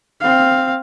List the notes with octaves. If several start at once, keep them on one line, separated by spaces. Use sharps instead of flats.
C4 F5